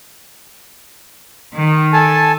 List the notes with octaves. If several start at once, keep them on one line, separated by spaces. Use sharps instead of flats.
D#3
A4 G#5 A5